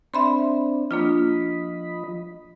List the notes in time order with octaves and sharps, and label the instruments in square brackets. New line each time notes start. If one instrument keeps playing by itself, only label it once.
[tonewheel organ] C4 D4 [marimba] E5 B5 C6
[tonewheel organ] F3 D#5 B5 [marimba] A#3 D4 F4